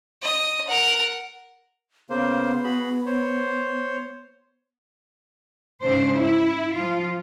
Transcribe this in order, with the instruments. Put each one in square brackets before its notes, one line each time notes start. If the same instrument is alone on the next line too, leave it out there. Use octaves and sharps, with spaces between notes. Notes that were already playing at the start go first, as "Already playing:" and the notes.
[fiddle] D#5 D#6
A#4 F#5
[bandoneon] C#3 A#3 C5 [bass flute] B3
[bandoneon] F#4 G#4 B5
C5 C#5
[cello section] G#2 C#3 D4 C5
E4
F3 F4